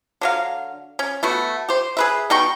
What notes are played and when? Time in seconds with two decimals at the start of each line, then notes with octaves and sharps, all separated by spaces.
0.21 D3 F#3 F5
0.99 C#4
1.23 A3 B3 F#4
1.69 G4 C5
1.97 G#4 B4 E5
2.30 B2 D#4 G5 C#6